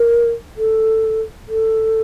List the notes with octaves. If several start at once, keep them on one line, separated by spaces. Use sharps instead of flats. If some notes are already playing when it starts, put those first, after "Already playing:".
Already playing: A#4
A4
A4